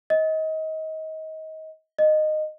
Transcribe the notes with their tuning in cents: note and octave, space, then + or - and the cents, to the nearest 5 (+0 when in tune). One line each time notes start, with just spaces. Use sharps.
D#5 +25
D#5 -15